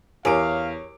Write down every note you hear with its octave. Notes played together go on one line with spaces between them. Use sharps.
E2 G4 A#4 C#5 F5 G#5 D6 D7